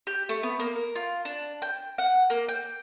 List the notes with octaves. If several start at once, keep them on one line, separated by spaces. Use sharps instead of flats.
G4
A3
B3
A#3
A#4
F4
D4
G5
F#5
A#3
G5